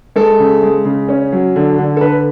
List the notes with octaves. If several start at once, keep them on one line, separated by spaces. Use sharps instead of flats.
G#3 A4
C#3
G#3
C#3
C#4
F#3
D3
D3
A4
D3 B4